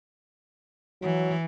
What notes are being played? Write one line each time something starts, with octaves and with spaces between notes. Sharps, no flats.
E3 F#3